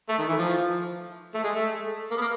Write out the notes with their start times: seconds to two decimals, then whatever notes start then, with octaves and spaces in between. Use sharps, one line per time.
0.09 A3
0.18 D#3
0.28 E3
0.38 F3
1.34 A3
1.44 G#3
1.54 A3
2.11 A#3
2.17 B3
2.21 A#3